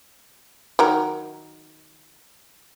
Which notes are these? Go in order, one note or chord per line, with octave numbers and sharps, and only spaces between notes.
D#3 F#3 A#4